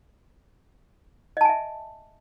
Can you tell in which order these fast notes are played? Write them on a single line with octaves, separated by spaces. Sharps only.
D#5 A5 G#5 E5